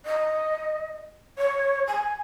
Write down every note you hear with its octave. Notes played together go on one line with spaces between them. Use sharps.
D#5
C#5
G#5